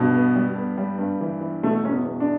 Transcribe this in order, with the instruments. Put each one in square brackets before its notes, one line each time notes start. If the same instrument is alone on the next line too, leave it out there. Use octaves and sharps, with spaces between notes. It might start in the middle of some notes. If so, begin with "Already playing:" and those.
Already playing: [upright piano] G2 [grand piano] B2
[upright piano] B3
G3
B3
G3
G2
E3
E3
[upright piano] B2 [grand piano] A3
[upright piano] E2 [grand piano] C#4
[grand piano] B3
[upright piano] E2
[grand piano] D4